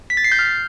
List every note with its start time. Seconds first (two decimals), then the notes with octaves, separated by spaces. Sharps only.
0.10 B6
0.17 A6
0.24 C7
0.32 G6
0.39 F6